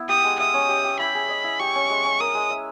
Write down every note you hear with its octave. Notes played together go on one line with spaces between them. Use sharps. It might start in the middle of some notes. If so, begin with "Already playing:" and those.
Already playing: B3 E4
G4 D#6
G#3
E5 D#6
C#4
G4
G4
E4 B5
G#4
D#5
E4
G4 C#6
C#4
G#3
C#4
A#4 D#6
G#3
E5